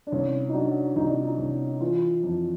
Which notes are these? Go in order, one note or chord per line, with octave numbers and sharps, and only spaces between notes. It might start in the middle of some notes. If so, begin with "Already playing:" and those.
D4
C2 C#4
D#4
F#3 D4
C2 D#4
D4
D#4
C2
E3 F4
F2